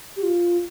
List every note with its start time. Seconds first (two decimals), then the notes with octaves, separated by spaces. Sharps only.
0.16 G4
0.23 F4